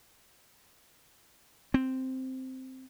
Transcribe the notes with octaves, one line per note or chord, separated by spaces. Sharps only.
C4